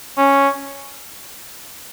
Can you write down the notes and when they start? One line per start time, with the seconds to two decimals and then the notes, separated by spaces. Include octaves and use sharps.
0.17 C#4